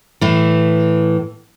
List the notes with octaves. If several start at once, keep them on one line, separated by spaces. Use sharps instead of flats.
A2 E3